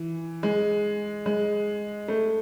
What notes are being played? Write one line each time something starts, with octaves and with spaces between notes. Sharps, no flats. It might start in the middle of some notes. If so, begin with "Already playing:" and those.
Already playing: E3
G#3
G#3
A3